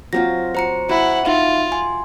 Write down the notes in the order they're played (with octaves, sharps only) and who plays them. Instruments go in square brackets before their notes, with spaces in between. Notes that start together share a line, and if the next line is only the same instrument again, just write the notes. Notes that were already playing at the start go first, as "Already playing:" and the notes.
[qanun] F#3 C4 F4 [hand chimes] A#6
[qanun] F#4 [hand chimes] C5 A#5 C#7
[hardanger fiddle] E4 F#5 [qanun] F#4
[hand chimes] D#4 E5 F5 [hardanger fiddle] F4
[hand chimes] G#5 C6